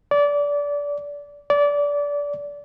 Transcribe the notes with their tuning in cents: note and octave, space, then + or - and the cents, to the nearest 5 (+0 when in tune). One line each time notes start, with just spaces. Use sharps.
D5 -25
D5 -25